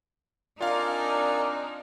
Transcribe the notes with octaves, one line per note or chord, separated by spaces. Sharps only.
C4 D4 D#4 F4 A#4 D5 F5 G#5